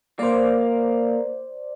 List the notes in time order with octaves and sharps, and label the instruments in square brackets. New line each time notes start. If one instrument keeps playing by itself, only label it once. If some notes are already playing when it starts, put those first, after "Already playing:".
[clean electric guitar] A#3 [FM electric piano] C5 D5